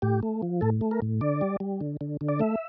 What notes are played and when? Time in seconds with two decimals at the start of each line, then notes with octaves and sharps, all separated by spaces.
0.02 A2 G4
0.23 A3
0.42 F3
0.61 A2 A4
0.81 A3
0.91 A#4
1.02 A2
1.21 D3 D5
1.41 G3
1.60 G3
1.81 D3
2.01 D3
2.21 D3
2.29 D5
2.40 A3 E5